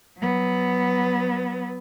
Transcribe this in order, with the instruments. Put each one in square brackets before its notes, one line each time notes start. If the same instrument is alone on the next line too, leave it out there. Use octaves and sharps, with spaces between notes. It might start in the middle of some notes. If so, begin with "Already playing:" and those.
[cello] F#3 B3